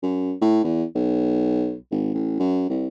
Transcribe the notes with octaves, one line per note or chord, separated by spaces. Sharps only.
F#2
A2
E2
B1
G#1
A1
F#2
C2